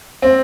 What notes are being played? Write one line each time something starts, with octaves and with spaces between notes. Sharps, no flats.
C4